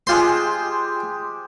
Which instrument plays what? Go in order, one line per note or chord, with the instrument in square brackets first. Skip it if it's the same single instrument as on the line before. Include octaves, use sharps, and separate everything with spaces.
[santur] G#3 G4 C5 [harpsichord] F4 C6